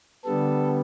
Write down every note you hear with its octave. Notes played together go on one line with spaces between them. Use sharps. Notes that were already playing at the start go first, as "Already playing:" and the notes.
D3 G3 B3 A4